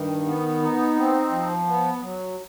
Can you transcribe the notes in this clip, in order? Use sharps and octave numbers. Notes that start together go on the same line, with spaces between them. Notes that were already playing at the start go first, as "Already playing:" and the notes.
Already playing: G2 D#3
B3
D#4
C4
F3
B3
F#3